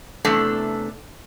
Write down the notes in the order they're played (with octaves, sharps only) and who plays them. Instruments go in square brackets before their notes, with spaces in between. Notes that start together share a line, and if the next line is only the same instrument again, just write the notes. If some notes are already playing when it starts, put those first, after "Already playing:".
[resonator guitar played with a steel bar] E2 C3 A3 D4 A4